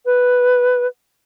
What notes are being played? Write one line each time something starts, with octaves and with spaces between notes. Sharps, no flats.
B4